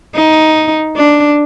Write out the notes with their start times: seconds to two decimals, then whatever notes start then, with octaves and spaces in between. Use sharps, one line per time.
0.15 D#4
0.97 D4